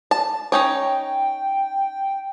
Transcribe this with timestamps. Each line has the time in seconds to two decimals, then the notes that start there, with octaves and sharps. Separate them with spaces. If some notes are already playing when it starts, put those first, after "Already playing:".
0.11 A5
0.52 C#4 D#4 C#5 G5